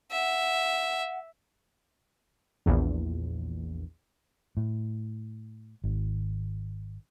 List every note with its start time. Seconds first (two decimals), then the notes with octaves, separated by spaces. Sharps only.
0.11 E5 F#5
2.66 A#1 E2
4.57 A2
5.84 G#1